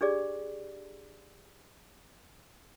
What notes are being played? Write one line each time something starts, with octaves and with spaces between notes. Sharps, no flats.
D4 G4 G#4 D5